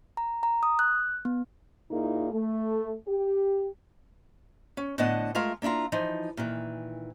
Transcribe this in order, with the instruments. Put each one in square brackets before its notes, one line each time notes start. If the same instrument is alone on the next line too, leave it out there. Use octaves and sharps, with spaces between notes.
[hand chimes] A#5
A#5
D#6
F#6
B3
[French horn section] A#2 A#3 D#4 E4 G#4
A3
G4
[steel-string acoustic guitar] C#4
A2 D3 B3 D#5 F#5 A5
G#3 A3 F4 A#4 F5
A#3 D4 E4 F4 A#5
E3 F3 D#4
A#2 D#3 E3